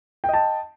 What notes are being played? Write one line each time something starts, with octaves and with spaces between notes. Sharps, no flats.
D#5 G5 A5